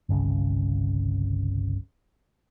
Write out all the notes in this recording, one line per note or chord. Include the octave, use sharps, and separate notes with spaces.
G1 C2 C#3